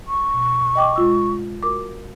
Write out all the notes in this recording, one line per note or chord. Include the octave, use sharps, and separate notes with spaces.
C#6
B2
D#5 G5 D6
G#3 F4 E6
F#4 A#4 D6